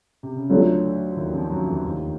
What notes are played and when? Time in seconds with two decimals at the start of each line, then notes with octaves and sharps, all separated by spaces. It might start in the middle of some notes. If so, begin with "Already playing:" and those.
0.23 C3
0.36 C#3
0.49 D2 D3 F#3 A3 D4 F4 A4
1.17 D#2 D#3
1.33 F2 F3
1.50 F#2 F#3
1.67 E2 E3
1.84 D#2 D#3